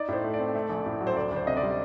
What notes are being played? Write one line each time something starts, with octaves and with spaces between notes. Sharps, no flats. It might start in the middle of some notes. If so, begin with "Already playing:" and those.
Already playing: D#4 D5
A2 C5
A3
D5
C4
A3
A#1
A2
F#3
C5
D2 D5
D2
C5
C3 D#5
D5
G3